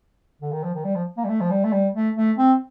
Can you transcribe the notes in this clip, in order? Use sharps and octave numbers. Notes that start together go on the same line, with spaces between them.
D3
D#3
F3
D#3
G3
F3
A#3
G3
A3
F3
G3
A3
G3
A3
A3
C4